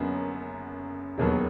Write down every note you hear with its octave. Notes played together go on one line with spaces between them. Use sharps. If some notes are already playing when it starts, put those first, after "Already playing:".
Already playing: F#1 F#2 D3 F#3 B3
E1 D#2 D#3 F#3 B3